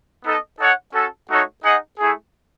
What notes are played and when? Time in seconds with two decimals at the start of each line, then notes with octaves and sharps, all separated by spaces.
0.24 B3 D#4 A4 D#5
0.60 D#4 A4 C#5 F#5
0.94 C#4 F#4 A4
1.30 A3 D#4 F#4 A4 C#5
1.64 D#4 G#4 D#5 F#5
1.99 A3 E4 G#4